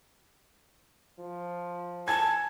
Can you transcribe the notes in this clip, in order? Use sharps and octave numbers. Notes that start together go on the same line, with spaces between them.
F3
G#5 A5 G#6